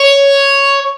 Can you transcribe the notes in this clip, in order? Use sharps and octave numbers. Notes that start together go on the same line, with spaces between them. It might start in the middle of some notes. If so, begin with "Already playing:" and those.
Already playing: C#5